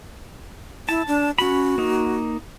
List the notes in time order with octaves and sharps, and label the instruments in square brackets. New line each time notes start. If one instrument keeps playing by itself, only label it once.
[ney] E4 [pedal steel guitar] A5
[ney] D4
[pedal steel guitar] C#4 B5 [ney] F#4
[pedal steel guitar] A#3 D#4